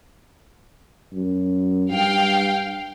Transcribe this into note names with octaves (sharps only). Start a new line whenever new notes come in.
F#2
G2 F5 G5